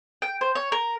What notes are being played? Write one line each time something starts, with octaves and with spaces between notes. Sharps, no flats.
G5
C5
C#5
A#4